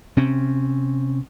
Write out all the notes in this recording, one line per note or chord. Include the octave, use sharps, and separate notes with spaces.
C3 C4 C#4